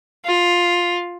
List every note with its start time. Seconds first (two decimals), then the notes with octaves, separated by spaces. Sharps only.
0.25 F4